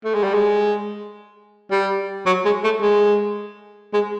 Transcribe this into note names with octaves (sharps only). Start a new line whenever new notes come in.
A3
G#3
G3
G#3
G3
F#3
G#3
A3
G#3
G#3